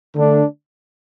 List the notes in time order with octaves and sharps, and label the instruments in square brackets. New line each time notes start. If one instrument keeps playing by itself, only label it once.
[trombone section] D3 A3 D4